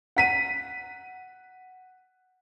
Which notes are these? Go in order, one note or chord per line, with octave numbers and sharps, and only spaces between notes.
F#5 B6 D#7